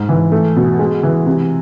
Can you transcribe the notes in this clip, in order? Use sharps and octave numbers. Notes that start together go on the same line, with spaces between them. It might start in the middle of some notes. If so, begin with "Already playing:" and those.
Already playing: G#2
E3
A3
B2
G#3
E3
C3